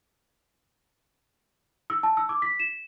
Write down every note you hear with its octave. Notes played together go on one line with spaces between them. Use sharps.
E6
A5
E6
D6
B6
E7